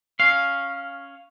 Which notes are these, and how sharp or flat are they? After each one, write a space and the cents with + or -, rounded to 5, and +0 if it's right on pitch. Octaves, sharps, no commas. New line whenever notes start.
C#4 +0 F5 +0